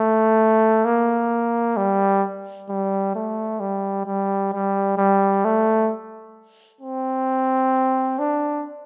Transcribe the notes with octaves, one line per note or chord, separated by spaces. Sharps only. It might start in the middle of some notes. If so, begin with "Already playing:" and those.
Already playing: A3
A#3
G3
G3
A3
G3
G3
G3
G3
A3
C4
D4